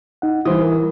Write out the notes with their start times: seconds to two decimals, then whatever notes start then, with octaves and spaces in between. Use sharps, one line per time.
0.22 D#4 F#5
0.45 E3 G3 C5 D#6
0.62 A#4